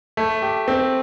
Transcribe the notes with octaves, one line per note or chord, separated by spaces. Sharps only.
A3
G4
C4